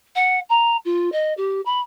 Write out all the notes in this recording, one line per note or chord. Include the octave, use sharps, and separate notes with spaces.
F#5
A#5
F4
D#5
G4
B5